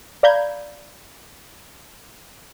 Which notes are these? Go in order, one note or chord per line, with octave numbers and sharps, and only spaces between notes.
D5 F5 A#5 B5 G6 G#6